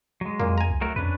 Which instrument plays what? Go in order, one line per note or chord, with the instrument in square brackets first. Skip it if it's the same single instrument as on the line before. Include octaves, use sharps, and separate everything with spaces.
[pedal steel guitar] F#3 G#3
[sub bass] F2 [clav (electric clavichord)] A#2 A#3
[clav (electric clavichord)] G#5 A#5
[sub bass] C2
[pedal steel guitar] F#3 A3 A#4
[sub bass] F2 [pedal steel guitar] C#4 D4 B4